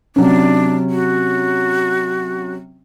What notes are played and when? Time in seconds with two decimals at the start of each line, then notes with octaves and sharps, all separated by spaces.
0.16 C3 F#3 C#4 D4
0.90 F#4